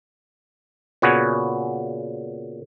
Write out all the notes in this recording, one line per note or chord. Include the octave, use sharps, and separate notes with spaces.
A#2 C#3 B3 F#4 G#5